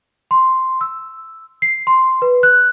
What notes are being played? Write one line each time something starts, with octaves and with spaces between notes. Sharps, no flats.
C6
E6
C7
C6
B4
F#6